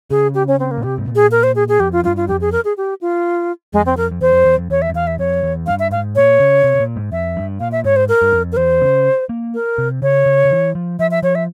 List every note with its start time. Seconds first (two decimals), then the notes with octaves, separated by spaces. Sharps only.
0.10 C#3 G#4
0.35 G4
0.48 C#4
0.60 C4
0.71 A#3
0.78 A#2
0.83 C3 G4
0.98 G#2
1.07 A#2
1.16 G#4
1.31 A#4
1.43 C5
1.55 G#4
1.69 G#4
1.80 F2 G4
1.92 F4
2.04 G2 F4
2.17 F4
2.28 F2 G4
2.41 G#4
2.52 A#4
2.65 G#4
2.77 G4
3.01 F4
3.73 F2 G#3
3.86 C4
3.97 F2 A#4
4.11 F2
4.21 E2 C5
4.33 F2
4.46 E2
4.58 F2
4.70 E2 C#5
4.82 E5
4.89 F2
4.94 E2 F5
5.07 E5
5.19 F2 C#5
5.43 E2
5.67 G2 F5
5.79 E5
5.91 G#2 F5
6.16 A#2 C#5
6.40 C#3
6.64 C3
6.75 C3
6.80 A#2
6.96 G#2
7.12 F2 E5
7.37 G2
7.60 A#2 F5
7.72 E5
7.84 G#2 C#5
7.96 C5
8.09 A#4
8.22 G2
8.32 F2
8.52 A#4
8.57 E2 C5
8.81 C#3
9.29 A#3
9.54 A#4
9.78 C3
10.02 C#3 C#5
10.26 C#3
10.45 C#3
10.51 E3
10.75 F3
10.99 F3 E5
11.11 E5
11.23 F3 C#5
11.35 E5